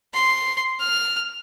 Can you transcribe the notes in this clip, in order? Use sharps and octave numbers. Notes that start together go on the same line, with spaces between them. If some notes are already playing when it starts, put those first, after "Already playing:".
C6
F6